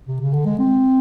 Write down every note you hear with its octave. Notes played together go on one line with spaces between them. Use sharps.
C3
C#3
D3
G#3
C4